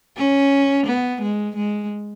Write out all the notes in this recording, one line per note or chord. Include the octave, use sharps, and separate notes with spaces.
C#4
B3
G#3
G#3